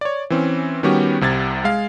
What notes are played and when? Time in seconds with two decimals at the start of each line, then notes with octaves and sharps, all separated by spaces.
0.01 C#5 D5
0.30 E3 C4 C#4
0.83 D#3 G3 B3 C#4 F#4 G4
1.21 C2 C3 G#6 A6
1.64 G#3 F5